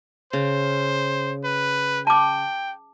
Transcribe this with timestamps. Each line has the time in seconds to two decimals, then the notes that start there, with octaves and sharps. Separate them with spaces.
0.33 C#3 C5
1.44 B4
2.07 G5 A5 D6